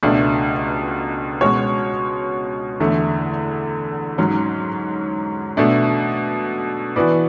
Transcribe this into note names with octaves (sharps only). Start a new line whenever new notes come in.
C#2 B2 A3 D4
B2 G#3 C#4 F#4 C#5
E2 D3 A3
G#2 F#3 C#4
B2 A3 D4
E3 B3 F#4 B4 D5